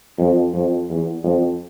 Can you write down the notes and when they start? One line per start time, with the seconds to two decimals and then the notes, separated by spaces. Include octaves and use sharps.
0.18 F2
0.53 F2
0.89 E2
1.23 F2